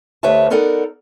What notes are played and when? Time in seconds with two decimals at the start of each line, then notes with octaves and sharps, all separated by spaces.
0.23 D2 G4 B4 C#5 E5 A5
0.50 B3 D#4 A4 A#4 D5 F#5